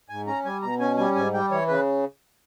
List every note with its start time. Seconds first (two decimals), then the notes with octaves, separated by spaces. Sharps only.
0.09 G#2 G#5
0.27 C#4 A#5
0.45 G3 G#5
0.62 B2 A#5
0.80 C#4 G#5
0.97 G3 G#5
1.15 G#2 G#5
1.33 G3 G5
1.51 E3 C#5
1.68 C#3 B4